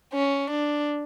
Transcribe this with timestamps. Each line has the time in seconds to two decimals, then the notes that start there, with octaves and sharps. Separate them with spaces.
0.13 C#4
0.51 D4